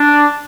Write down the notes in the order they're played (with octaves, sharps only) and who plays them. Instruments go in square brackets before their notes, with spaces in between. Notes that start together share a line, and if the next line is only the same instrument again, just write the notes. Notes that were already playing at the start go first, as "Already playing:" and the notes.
Already playing: [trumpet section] D4